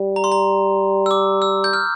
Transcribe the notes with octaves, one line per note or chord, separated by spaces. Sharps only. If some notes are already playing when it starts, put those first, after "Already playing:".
Already playing: G3
A#5
C6
A#5
E6
D6
E6
G6
F6